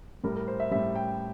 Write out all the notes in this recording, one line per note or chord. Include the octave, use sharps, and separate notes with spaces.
A2 G3 A#4
A#4
C5
E5
A2 G3 E5
G5